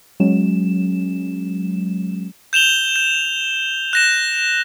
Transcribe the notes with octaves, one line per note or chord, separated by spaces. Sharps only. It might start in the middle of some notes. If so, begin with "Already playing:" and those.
F#3 G#3 C#4 E7
G6 E7 F7 G7
G6
F#6 A#6 E7